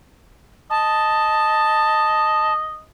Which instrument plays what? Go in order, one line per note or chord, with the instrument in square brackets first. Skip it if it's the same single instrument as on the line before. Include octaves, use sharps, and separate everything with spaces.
[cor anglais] D#5 [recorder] A5